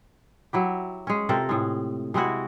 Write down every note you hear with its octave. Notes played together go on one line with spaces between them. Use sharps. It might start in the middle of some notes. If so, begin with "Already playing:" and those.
F#3 E4 G4
G#3 C#4
C3 F4 A4 A#4
A2 G#3
C3 G#3 E4 F#4